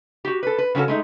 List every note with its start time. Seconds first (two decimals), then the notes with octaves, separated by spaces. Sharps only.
0.25 F#4 G4
0.43 A4 B4
0.58 B4
0.75 C#3 B3 C#4 F#4 A4
0.88 G#3 A3 D#4